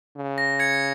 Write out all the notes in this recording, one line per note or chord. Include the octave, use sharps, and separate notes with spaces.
C#3
A#6
G#6 C#7